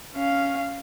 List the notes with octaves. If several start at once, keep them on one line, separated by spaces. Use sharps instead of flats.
C#4 F5